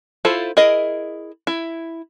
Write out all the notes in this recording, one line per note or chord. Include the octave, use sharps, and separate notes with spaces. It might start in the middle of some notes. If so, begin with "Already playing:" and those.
E4 F4 A4 C5
E4 G#4 A#4 D#5
E4